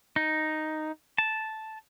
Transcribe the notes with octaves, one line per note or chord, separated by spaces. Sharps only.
D#4
A5